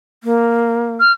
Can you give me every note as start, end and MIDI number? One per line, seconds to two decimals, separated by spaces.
0.24 0.96 58
1.00 1.12 89